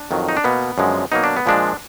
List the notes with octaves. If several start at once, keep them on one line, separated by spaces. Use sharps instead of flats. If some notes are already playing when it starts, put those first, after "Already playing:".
Already playing: D4
F2 D#3 F#3
D#4
D4
B2 A#3 B3
F#2 D3 F3 G#3
B2 F#3 A#3 D#4
D4
B3
A#2 F3 G#3 D4